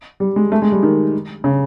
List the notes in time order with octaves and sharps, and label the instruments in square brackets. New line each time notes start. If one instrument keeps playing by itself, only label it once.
[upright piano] G3
G#3
A3
G#3
G3
D#3
C#3